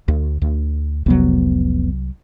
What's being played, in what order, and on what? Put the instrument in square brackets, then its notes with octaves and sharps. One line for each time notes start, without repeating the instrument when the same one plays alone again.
[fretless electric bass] D2
D2
[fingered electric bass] F1 B3 [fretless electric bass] C2 F#3